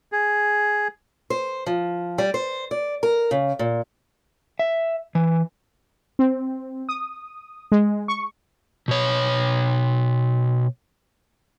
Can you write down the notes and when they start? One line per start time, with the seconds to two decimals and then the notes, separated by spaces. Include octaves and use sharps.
0.12 G#4
1.30 C5
1.66 F3
2.18 G3
2.34 C5
2.71 D5
3.03 A#4
3.31 C#3
3.59 A#2
4.59 E5
5.15 E3
6.19 C4
6.89 D#6
7.72 G#3
8.08 C#6
8.88 B2 C#5